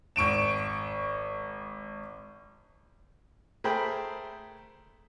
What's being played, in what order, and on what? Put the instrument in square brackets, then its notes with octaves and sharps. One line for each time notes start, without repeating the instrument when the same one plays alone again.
[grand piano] G#1 C#6 D7 E7
[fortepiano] A3 G#4 A#4 C5 G5 B5